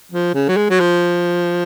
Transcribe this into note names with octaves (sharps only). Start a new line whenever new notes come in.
F3
C#3
F#3
G#3
F#3
F3